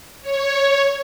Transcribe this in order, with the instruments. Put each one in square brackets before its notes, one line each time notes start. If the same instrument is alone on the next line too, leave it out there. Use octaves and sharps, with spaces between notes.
[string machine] C#5